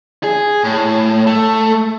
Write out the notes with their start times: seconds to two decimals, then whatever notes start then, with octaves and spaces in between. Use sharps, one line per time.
0.24 G#4
0.64 A2
1.27 A3